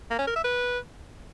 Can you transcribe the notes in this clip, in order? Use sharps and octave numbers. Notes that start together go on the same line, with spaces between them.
A#3
C#4
A#4
E5
B4